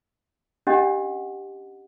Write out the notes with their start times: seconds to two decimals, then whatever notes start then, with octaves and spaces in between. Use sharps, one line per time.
0.67 C#4 D4 G4 D#5 F#5